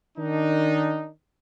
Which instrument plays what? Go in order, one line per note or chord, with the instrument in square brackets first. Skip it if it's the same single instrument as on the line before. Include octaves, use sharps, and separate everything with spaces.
[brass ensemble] D#3 D4 D#4